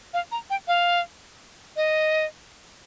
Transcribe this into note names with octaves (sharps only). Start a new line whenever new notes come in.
F5
A#5
G5
F5
D#5